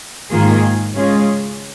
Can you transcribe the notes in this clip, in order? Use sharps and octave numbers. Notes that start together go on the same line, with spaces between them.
G#2 D#3 A#3 F4 G#4
C#3 G#3 C#4 F4 G#4